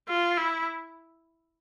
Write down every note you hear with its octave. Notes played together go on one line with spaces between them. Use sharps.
F4
E4